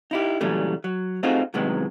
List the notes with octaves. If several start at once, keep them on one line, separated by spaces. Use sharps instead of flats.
D#4 E4 G4
A#2 C#3 E3 F#3 G3 A3
F#3
A3 C4 D#4 F4 F#4 G#4
F#2 A2 C3 D#3 G#3 B3